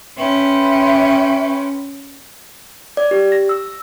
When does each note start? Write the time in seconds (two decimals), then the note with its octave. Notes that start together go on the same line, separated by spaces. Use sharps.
0.18 C#4 B4 E5 G5 C6
2.97 D5
3.11 G4
3.32 A#6
3.49 E6